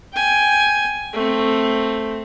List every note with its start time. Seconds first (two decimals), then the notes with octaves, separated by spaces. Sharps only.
0.13 G5 G#5
1.13 A3 C4